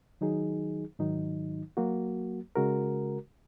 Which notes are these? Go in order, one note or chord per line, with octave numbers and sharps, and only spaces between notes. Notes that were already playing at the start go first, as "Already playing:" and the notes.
D#3 F#3 D#4 G#4
G#2 D#3 F#3 D#4
F#3 A#3 F#4
C#3 G#3 F#4 A#4